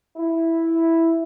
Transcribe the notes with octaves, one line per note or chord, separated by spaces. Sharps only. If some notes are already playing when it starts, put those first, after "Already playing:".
E4